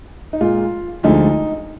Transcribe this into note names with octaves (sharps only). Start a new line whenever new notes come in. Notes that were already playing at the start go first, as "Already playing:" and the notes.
D#4
A#2 G#3 F4
D2 D3 F3 G#3 D#4